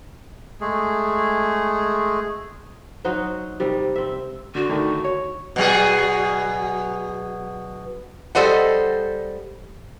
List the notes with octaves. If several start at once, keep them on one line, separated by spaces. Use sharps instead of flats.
G#3 A3 G#4
F#3 D#4 F#4 C5
C3 D#3 G3
C4 E5
D3 F#4
D3 D#3 A3
C#5
B2 F#3 G#4
G3 A4 C5 D#5 F#5